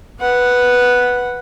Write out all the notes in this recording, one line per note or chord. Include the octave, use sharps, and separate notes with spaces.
B4 F#5